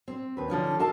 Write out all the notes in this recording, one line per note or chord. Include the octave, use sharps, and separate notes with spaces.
C4
D#2 B4
D3 F3 C#4 D#4
A4 A#4 D#5 F5 A5